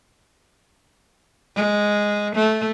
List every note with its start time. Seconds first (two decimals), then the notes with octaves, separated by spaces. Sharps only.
1.56 G#3
2.35 A3